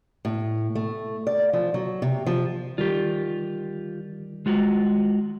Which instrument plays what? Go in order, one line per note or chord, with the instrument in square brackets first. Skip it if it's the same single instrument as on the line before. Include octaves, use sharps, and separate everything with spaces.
[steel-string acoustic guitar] A2
A3
D5
F3
F#3
C3
F3
[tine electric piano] D#3 G3 [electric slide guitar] F4 G4
[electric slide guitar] G#3 F4 F#4